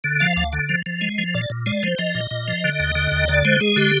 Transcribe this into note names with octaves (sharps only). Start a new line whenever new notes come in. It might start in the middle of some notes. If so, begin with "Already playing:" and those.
D3
F3 F5
D2 F5
D3
F3
F3
G#3
F3
A#2 D5
A#2
G#3 D5
F3 C5
F3 D#5
A#2
A#2
F3
D3
D#2
D3
D#2
D3 D5
G#3 C5
G#3 G#4
D3 G4